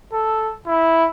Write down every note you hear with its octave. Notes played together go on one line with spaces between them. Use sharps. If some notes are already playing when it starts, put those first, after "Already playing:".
A4
E4